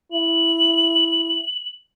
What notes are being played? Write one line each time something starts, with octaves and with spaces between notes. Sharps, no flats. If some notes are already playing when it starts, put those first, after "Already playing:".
E4 F#7